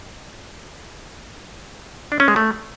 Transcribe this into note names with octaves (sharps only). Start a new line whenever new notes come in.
D4
C#4
G#3
A3